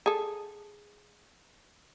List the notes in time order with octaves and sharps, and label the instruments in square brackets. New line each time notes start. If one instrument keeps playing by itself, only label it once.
[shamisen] G#4 A4